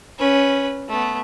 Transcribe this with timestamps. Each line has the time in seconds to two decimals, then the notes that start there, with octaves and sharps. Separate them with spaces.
0.19 C#4 B4
0.88 A3 B3